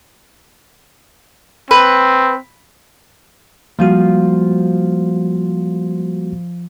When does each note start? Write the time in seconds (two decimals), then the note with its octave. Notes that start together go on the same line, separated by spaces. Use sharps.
1.71 C4 B4
3.79 F3 G3 A#3 F4 F#4